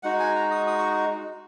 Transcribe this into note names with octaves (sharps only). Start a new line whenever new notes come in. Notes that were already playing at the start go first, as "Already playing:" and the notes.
G#3 D#4 F#4 F#5
G#5
A#5
D#6
D#6
C#6